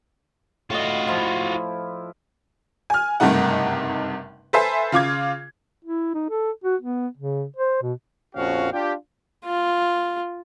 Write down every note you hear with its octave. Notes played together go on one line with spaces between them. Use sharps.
A2 F4 F#4 D#5
F3 E4
G#5 F6
F#1 G2 C3 A3 D#4 F#5
A4 B4 C5 E5 G#5
C#3 F4 D6 G#6
E4
D#4
A4
F#4
B3
C#3
C5
B2
A#1 F2 F3 C#4 F#4 F5
D4 F4 G4
F4